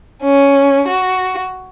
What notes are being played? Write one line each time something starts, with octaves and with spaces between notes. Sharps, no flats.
C#4
F#4